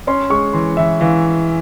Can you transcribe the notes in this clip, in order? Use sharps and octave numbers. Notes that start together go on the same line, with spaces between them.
C#4 C6
G#3 C#6
E3 C6
E3 E5
E3 F5